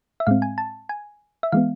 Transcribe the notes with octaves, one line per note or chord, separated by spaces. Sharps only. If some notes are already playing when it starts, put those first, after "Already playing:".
E5
A2 G#3 C4 F5
G#5
A5
G#5
E5
E3 G#3 B3 F5